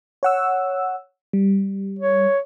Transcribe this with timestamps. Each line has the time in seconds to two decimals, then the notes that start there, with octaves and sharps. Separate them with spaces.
0.23 C#5 F#5 E6
1.33 G3
1.99 C#5